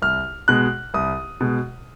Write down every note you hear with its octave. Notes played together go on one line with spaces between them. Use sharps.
C2 F6
B2 G#3 F#6
C2 D#6
B2 G#3